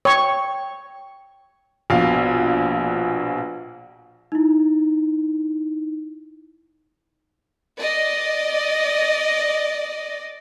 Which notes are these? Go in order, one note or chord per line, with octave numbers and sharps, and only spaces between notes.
C#5 G5 C#6
A#1 B2 F5
D#4 E4
D5 D#5